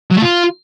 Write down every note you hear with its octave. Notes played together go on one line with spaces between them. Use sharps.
F#3
A3
F4